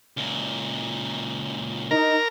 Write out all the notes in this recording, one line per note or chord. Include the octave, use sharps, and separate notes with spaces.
C#2 A#2
D#4 A#4